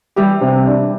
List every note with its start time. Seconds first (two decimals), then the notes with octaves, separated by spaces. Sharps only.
0.16 E3 G3 G4
0.41 C3
0.66 D4